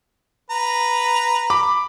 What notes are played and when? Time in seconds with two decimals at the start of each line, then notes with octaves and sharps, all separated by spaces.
0.50 B4 A#5
1.50 B5 D6